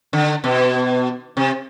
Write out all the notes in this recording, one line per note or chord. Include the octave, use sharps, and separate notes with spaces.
D3
B2
C3